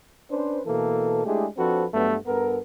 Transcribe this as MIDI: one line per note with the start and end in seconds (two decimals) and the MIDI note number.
0.31 0.59 61
0.31 0.59 62
0.31 0.59 71
0.31 0.59 72
0.66 1.24 47
0.66 1.24 52
0.66 1.24 58
0.66 1.24 69
1.25 1.46 56
1.25 1.46 57
1.25 1.46 62
1.25 1.46 64
1.25 1.46 67
1.25 1.46 68
1.57 1.85 53
1.57 1.85 60
1.57 1.85 62
1.57 1.85 66
1.57 1.85 69
1.57 1.85 71
1.94 2.16 43
1.94 2.16 54
1.94 2.16 55
1.94 2.16 57
1.94 2.16 59
2.26 2.58 43
2.26 2.58 59
2.26 2.58 69
2.26 2.58 70